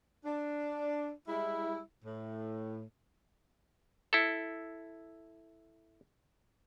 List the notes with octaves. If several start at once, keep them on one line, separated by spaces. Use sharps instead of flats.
D4
G3 G#3 E4
A2
E4 A4